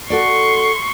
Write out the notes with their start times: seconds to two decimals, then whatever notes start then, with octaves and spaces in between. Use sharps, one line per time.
0.10 F#4 A4 D5 C6 C#6